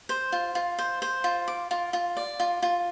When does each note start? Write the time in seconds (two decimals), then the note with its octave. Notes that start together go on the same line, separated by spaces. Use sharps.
0.09 C5
0.32 F4
0.55 F4
0.79 C5
1.02 C5
1.24 F4
1.48 D6
1.71 F4
1.93 F4
2.17 D5
2.40 F4
2.62 F4